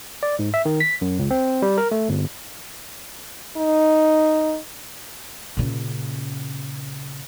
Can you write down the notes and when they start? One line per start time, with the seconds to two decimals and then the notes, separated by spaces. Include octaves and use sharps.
0.23 D5
0.39 G#2
0.54 E5
0.65 D#3
0.80 B6
1.01 F#2
1.19 C#2
1.31 C4
1.62 G3
1.78 A#4
1.91 A3
2.09 G1
3.57 D#4
5.57 A#2 C#3